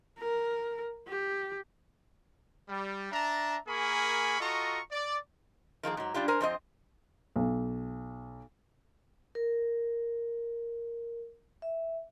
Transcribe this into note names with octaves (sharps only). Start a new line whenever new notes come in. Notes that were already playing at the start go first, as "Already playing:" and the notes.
A#4
G4
G3
D4 E5 A5 A#5
A#3 G#4 A#4 G#5 B5 C#6
F4 F#4 A4 D#5 A#5 C#6
D5
D#3 F3 A#3 G#4
G#2 F#3
G3 D4 F4 G4
A#4 C5 G#5
F2 C4 C5 D#5
B1
A#4
E5